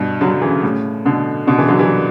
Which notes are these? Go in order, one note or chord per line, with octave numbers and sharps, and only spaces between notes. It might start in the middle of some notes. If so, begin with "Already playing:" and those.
Already playing: G2 B2
D3 F#3
F#3
C#3 E3
A2 C#3
B2 D3
B2 D3
C#3 E3
D3 F#3
E3 G3